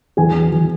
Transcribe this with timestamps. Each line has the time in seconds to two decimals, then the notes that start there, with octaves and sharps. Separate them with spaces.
0.17 E2 G#4 G#5
0.35 E2
0.52 E2